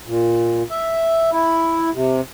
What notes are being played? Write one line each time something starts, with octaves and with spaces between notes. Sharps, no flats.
A#2
E5
E4
C3